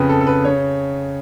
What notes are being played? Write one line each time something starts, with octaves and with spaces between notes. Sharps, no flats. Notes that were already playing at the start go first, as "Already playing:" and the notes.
Already playing: F2 C#3 B4
A4
A4
B4
C#3 C#5